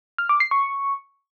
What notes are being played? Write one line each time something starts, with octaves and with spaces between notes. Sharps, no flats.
F6
D6
C7
C#6